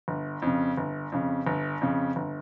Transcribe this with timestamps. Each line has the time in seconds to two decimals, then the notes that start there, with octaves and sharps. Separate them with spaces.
0.08 G1
0.42 F2 C#3
0.77 G1
1.12 F2 C#3
1.47 G1
1.81 F2 C#3
2.16 G1